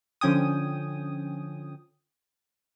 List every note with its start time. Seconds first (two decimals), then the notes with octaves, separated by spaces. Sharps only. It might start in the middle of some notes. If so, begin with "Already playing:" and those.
0.21 D3 F3 C#4 G5 G#5 D#6